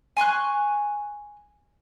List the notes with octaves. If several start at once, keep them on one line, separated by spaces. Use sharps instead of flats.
G#5 C6 C#6 F#6